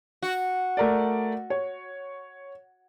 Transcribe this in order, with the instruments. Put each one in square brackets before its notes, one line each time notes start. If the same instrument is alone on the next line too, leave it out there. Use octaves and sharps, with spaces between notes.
[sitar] F#4
[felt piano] A3 A#4 D5
C#5